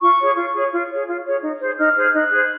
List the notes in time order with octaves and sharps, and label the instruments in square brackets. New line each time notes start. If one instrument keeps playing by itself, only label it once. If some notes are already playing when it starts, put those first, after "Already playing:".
[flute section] F4 C#6
G#4 C#5
F4
G#4 C#5
F4
G#4 C#5
F4
G#4 C#5
D#4
G#4 C5
D#4 F6
G#4 C5
D#4 F#6
G#4 C5